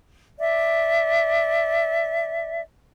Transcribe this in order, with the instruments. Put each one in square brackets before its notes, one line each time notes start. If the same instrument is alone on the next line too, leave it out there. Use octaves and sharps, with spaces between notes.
[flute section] D5 E5